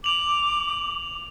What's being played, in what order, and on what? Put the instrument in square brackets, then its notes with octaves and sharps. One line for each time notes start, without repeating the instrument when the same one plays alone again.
[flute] D6 [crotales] F7 F#7